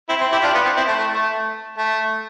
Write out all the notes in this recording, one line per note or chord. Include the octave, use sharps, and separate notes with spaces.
C4 E4
C4
E4 G4
D4 F4
B3
C4
C4 E4
A3
A3
A3
A3